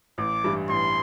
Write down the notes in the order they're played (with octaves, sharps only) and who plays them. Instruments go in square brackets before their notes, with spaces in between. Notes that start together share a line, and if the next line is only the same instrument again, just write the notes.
[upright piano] A1 [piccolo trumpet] D6
[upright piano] G2 E3 G3
[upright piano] A1 [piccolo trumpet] C6